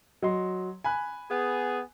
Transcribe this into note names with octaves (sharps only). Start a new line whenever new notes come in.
F#3 D#5 C6
G#5 B5 F#6
B3 G#4